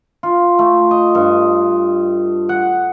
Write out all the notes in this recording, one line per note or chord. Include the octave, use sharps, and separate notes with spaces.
F4
A3
D#5
G2
F#5